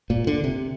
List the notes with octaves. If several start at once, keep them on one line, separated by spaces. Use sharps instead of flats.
A#2
D3
C3